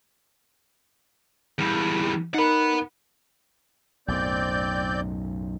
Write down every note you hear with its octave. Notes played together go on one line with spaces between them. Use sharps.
E2 G3
D#4 A#4 F#5 B5
B1 F#2 A2 C4 D5 G6